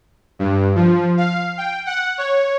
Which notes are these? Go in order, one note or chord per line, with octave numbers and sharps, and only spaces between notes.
G2
F3
F5
G5
F#5
C#5